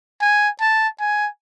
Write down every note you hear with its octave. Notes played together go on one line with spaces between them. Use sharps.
G#5
A5
G#5